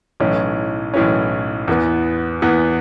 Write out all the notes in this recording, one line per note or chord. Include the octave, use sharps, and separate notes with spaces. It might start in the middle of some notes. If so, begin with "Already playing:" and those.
B1 A2 E3 C#4
B1 A2 E3 C#4
E2 E3 B3
E2 E3 B3